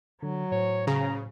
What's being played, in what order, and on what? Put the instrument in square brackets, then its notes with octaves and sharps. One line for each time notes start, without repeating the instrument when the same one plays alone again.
[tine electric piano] D3 [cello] F#3
[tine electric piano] A2 C5 [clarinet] C#5
[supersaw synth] C#3 [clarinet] A#5